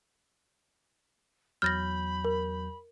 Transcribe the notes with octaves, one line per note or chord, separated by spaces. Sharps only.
E2 F#3 B5 F6 G6 A6 A#6
A#4